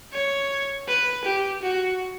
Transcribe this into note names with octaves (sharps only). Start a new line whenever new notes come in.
C#5
B4
G4
F#4